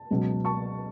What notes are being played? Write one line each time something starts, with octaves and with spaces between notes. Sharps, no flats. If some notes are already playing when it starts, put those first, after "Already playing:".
Already playing: A5
C#2 B2 F#3
A5 C#6